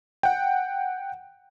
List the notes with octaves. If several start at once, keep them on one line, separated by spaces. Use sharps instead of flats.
F#5 G5